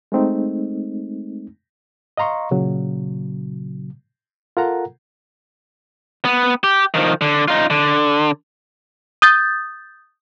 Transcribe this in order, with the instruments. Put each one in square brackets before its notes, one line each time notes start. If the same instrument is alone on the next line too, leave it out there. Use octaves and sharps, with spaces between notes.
[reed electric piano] G#3 A3 C4 D#4
D#5 F5 A#5 C6 C#6
A#2 C#3 F#3
F4 A4 A#4 F#5 A#5
[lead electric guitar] B3
G4
D#3 F3
D3
D#4 F4
D3
[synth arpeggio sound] D#6 G6 A6